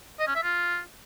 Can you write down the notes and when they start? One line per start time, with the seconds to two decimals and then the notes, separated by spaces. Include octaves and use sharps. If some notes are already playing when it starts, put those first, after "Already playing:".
0.19 D#5
0.27 C#4
0.35 E5
0.43 F4